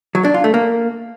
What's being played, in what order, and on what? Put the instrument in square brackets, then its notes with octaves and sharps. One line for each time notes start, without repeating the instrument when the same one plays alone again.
[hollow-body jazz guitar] F#3
D4
F4
A3
A#3